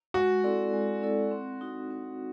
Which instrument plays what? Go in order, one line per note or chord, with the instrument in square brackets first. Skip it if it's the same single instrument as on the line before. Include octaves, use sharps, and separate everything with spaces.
[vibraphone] G#3 [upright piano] F#4
[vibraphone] C4 E4 A4 D5
G#3
C4 E4 A4 D5
C4
D#4 F#4
C4